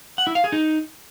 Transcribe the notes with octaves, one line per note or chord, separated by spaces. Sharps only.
F#5
E4
F5
G#4
D#4